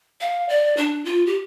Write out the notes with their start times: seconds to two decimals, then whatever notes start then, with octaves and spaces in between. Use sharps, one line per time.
0.21 F5
0.49 D5
0.77 D4
1.05 F4
1.26 G4